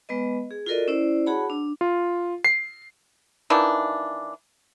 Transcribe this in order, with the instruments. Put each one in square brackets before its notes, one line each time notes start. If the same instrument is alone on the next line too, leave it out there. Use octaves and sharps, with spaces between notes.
[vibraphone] G#3 B3 B4 D#5
G#4
F4 F#4 A4 A#4 D5 D#5
C#4 E4 C5 D5
F#4 G#4 C#5 F#5 A5 B5
D4
[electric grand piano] F4
C7
[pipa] D#3 E3 A#3 D4